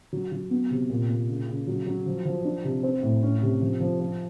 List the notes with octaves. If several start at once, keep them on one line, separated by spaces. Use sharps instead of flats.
F#3
F#3
B3
C3
A#2
A#2
C#3
C#3
F#3
F#3
F3
F3
D4
C3
C4
A2
C#4
C3
F3
F3
F3